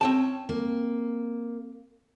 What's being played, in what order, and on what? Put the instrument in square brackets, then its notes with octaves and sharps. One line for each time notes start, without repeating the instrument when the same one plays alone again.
[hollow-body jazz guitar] C4 G5 A5 [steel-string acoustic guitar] C#4
[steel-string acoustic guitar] A#3